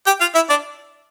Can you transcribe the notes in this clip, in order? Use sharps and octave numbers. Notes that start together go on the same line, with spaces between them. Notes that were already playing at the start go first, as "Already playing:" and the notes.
G4 G5
F4 F5
E4 E5
D4 D5